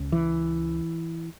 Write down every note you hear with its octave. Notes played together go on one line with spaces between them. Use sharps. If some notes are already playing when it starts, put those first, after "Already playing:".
Already playing: C#2 C#3
E3